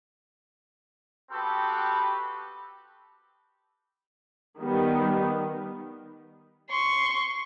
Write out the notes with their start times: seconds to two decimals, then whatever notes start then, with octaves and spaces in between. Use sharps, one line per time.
1.30 B3 C4 F#4 G4 A4 B4
4.60 D#3 G3 B3
6.70 C6 C#6